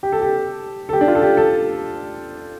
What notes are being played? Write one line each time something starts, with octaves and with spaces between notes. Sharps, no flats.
G4
A4
G4
A4
G4
D4
F4
A4
G4
A4